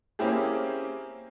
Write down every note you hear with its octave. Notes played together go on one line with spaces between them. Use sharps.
A#3 C4 C#4 E4 G4 G#4